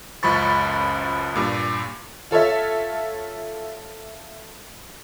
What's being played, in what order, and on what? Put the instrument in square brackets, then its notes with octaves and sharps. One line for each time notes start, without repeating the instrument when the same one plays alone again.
[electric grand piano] C#2 F#2 F3 B5 C#6 A6
G2 A#2
[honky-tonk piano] F4 A4 C#5 E5